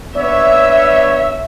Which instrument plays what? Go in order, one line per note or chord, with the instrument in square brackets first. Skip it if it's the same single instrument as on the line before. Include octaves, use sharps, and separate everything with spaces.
[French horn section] B3 D4 C#5 [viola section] E5